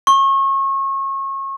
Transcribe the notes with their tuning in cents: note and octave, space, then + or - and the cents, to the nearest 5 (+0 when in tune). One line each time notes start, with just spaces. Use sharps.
C#6 -30